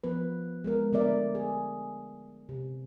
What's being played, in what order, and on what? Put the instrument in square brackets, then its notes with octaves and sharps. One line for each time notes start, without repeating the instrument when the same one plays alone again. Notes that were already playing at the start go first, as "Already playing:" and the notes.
[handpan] F3 B3 B4
G#3 B3 A#4
D3 A3 B3 A#4 D5 E5
G#4
C3